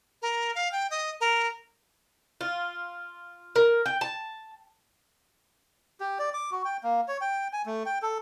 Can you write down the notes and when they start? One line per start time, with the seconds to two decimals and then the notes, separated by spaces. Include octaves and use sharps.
0.22 A#4
0.55 F5
0.72 G5
0.90 D#5
1.21 A#4
2.41 F4
3.56 A#4
3.86 G5
4.01 A5
6.00 G4
6.19 D5
6.34 D6
6.51 F#4
6.65 G5
6.84 A#3
7.08 C#5
7.21 G5
7.53 G#5
7.66 A3
7.86 G5
8.02 A4